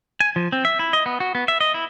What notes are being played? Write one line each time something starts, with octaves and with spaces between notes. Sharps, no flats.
G#5
F3
C4
E5
E4
D#5
B3
F#4
B3
E5
D#5
E4